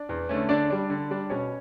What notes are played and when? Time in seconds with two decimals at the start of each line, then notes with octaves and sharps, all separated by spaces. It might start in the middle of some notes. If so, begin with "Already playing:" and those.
Already playing: D4 D5
0.09 E2
0.29 D3 A3 C#4
0.49 D3 D4 D5
0.70 G3 D4
0.90 D3
1.11 G3 D4
1.29 B2 C#4 C#5